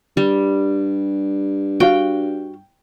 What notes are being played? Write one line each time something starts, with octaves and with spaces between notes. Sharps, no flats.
G2 G3
F#4 F5 G5